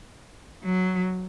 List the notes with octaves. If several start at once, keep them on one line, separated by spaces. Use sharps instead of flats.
F#3